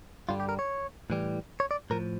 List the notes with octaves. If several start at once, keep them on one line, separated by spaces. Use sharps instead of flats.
G2 D3 G3 F4
G4
A#4
C#5
A2 E3 G3
C#5
D5
A2 F3 A#4